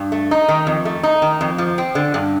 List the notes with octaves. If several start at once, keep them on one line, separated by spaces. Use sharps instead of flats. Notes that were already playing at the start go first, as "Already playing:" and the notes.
Already playing: G2
A3
D#4
D#3
F2
A3
D#4
D#3
F2
F3
C4
D3
G2